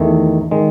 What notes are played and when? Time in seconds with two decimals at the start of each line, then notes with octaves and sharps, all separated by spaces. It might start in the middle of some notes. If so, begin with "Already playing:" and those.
Already playing: E2 D#3 A3
0.51 D#3 G#3